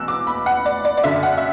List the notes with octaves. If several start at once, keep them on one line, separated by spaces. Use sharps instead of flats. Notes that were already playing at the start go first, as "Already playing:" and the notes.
Already playing: E2 B2 E6 F#6
D6
B5
F#5
D5
D5
D5
F#2 D3 E5
F#5
E5